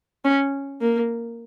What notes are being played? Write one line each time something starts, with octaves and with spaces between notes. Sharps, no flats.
C#4
A#3